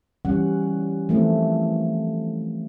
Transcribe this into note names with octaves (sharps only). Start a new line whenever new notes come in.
E3 G3 C#4 F#5
E3 F3 A3 A#3 C4